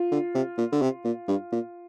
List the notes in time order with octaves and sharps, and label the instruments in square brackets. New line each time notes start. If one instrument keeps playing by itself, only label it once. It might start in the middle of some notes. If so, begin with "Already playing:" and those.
Already playing: [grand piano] F4
[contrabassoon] D3
C3
A#2
D3
C3
A#2
G2
A#2